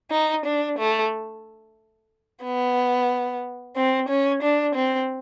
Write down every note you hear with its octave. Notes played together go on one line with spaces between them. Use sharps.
D#4
D4
A3
B3
C4
C#4
D4
C4